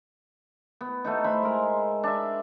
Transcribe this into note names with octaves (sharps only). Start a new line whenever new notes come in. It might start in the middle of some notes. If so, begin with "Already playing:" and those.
B3
A3 B3 D#4
C5 E5 B5
G#3 A#4
D4 E5